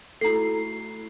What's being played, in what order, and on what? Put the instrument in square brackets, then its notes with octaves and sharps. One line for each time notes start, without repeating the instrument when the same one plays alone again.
[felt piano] A3 E4 F#4 [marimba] A4 A#5 [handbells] C7